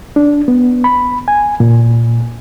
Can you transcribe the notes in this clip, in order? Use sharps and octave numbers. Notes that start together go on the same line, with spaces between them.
D4
B3
B5
G#5
A#2